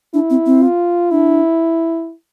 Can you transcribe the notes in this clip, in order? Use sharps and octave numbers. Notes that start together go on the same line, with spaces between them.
D4 E4
C4
C4
F4
D4 E4